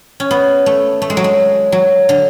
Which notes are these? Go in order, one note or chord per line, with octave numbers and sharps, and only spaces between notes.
C#4
B3
A3
A3
G#3
F#3
G#3
F#3
D3